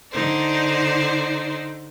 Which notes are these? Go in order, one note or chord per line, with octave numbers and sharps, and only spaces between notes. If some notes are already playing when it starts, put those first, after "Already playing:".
D3 D#4 C5 D5